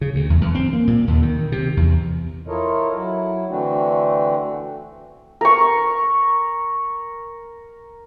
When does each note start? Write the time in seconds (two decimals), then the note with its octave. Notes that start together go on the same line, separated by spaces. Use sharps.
0.01 C#3
0.15 D2
0.30 E2
0.41 E2
0.55 C4
0.73 A#3
0.87 A#2
1.08 D#2
1.22 D#3
1.52 C3
1.77 E2
2.48 E4 F4 A4 A#4 C#5 D#5
2.94 F#3 E4
3.49 D3 E3 A3 C4 D4 F#4
5.41 A#4 C#6